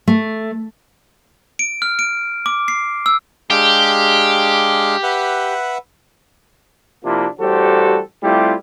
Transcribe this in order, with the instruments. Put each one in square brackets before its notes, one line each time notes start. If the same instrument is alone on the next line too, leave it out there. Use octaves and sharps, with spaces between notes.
[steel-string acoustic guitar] A3
[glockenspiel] D7
F6
D7
D6
C7
E6
[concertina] G#3 D4 F5 [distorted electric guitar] G4
[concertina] B4 E5 F#5
[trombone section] C3 F3 A#3 D4 E4 F4
A1 G3 F#4 G4 A4 C5
G3 A3 C4 E4 F4 G4